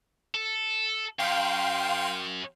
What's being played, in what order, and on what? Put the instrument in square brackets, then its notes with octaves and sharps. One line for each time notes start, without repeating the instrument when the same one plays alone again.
[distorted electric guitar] A4
[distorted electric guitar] F#2 [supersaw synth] F5 G5 C6